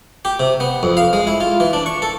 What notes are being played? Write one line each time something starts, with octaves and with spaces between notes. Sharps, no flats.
G4
C3
B3
F2
F5
G#3
E4
F4
E3
D4
C#6
A4